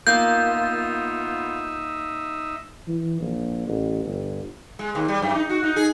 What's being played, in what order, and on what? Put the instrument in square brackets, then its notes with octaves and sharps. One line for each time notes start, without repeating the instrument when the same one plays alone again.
[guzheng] A#3 [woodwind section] B3 F4 [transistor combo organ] D#4 E5 [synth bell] G6
[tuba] E3
A#1
A1
G1
[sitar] G#3
D#2
G3
F#2
D#4
F#4
D#4
G#4